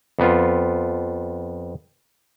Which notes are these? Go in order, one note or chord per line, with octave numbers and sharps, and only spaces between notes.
F2 B3 F4